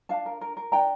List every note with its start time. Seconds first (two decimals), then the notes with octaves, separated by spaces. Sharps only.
0.09 D4 F5 A5
0.26 A#4
0.41 A#4
0.57 A#4
0.72 D4 G5 A#5